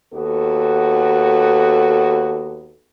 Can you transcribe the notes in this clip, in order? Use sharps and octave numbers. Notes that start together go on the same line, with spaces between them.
D#2 B3 F#4 A4